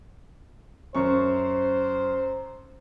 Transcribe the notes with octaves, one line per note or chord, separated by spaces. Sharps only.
F#2 C5 C#6